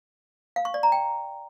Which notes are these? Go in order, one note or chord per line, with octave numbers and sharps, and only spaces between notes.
F5
C#6
D5
A#5
G5